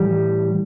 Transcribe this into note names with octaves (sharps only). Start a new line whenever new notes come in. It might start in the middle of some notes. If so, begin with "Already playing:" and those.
Already playing: A2 E3 G3